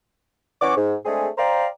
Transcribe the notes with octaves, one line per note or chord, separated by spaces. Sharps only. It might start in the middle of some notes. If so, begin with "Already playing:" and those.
E3 C#4 F#5 C#6 D6
G#2
G#3 A3 C4 D4 G#4
C5 D5 F5 G5 A#5